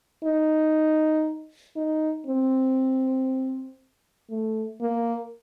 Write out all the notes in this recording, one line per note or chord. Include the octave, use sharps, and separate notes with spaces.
D#4
D#4
C4
A3
A#3